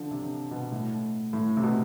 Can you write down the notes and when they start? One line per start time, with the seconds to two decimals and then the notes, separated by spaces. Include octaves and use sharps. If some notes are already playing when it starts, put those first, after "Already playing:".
Already playing: D3 F3
0.11 C3
0.51 B2
0.72 A2
1.33 A2
1.57 C3
1.63 B2